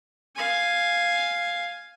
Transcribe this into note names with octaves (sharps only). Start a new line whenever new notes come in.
F5 G#5